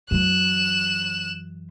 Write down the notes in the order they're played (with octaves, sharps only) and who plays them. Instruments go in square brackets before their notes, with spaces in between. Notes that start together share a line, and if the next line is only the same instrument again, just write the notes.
[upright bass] F#2 E3 [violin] F#6 E7